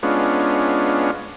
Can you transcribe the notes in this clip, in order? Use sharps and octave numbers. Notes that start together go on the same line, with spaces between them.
G#3 B3 C#4 D4 F4